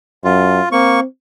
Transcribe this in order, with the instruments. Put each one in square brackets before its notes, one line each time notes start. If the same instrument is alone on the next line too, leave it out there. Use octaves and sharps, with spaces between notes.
[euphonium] F#2 [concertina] F4
[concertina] A#3 C#6 [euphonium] C4